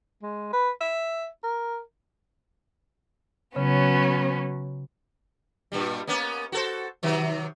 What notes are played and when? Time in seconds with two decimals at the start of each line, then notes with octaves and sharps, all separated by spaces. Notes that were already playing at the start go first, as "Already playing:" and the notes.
0.23 G#3
0.53 B4
0.81 E5
1.43 A#4
3.56 C#3 F#3 B3 C#4
5.72 G2 A#2 G3
6.07 A#3 B3 C#4
6.52 F#4 A4 C5
7.03 C3 D#3 F#3